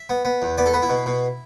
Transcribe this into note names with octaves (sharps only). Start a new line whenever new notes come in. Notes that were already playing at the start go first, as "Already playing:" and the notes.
Already playing: E5
B3
B3
E2
B3 D5
A4
B3 B4
E4
B2
B2